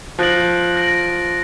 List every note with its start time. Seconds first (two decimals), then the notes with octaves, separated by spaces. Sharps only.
0.19 F3 F#6 A#6 D7 F#7
0.76 F#6 A#6 D7 F#7